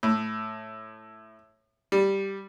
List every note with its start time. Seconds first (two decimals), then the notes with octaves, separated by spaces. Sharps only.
0.03 A2
1.92 G3